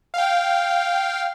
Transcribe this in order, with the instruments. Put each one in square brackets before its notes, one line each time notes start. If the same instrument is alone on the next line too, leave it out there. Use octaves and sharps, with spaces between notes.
[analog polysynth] F5 G5